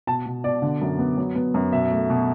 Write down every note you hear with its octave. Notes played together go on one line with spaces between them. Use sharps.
B2 A5
B2
B2 D5
D3
F#2
B3
F#3
B3
F#2
B2 E5
A3
B2